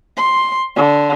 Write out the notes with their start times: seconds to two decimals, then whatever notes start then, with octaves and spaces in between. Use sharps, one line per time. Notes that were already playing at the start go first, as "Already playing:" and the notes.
0.17 C6
0.76 D3